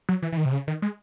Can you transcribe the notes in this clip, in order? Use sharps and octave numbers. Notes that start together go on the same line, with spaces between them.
F#3
E3
E3
D#3
C3
C#3
D#3
G#3